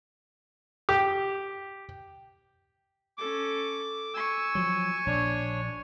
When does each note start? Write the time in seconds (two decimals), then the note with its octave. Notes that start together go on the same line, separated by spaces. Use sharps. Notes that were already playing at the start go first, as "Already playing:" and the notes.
0.89 G4
3.18 C#4 A4 D6
4.14 G#5 C#6 E6
4.55 F3 F#3
5.06 A#1 D4 C#5